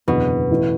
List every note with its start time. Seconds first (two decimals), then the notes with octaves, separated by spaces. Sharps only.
0.08 F#1 E2 B2 D3
0.50 A1 A2 E3 A3